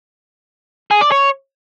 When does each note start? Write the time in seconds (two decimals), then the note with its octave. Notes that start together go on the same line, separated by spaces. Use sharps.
0.91 G#4
1.01 D5
1.12 C#5